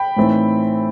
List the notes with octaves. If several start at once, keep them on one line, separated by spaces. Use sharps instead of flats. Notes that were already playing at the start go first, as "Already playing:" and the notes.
Already playing: G5 B5
A2 E3 A3 C4 D#4